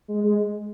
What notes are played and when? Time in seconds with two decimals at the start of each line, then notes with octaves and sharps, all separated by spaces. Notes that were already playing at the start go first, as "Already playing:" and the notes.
0.08 G#3
0.24 G#3